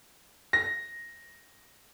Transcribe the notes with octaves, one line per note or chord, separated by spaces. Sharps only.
A#6